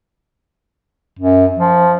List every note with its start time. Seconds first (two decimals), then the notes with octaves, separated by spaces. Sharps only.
1.19 F#2
1.59 F3